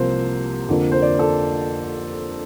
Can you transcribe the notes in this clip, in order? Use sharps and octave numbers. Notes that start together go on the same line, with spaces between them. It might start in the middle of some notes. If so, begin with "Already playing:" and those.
Already playing: C2 C3 F3 A#3 C5
F2 D3 F3 A#3
C5
D5
A4